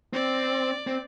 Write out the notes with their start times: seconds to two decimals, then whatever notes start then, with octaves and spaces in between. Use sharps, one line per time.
0.13 C4 D5
0.87 C4